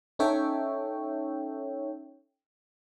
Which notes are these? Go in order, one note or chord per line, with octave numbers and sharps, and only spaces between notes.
C#4 D#4 A4 C#5 E5 G5